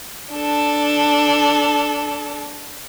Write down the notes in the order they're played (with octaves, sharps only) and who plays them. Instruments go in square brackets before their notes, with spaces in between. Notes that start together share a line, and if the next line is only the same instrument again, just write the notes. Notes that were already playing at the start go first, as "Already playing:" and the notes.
[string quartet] D4 A4